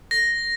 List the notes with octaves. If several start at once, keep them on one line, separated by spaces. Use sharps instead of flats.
A#6